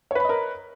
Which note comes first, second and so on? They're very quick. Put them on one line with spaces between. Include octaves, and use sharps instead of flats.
C#5 B4 B5 D#5 A#4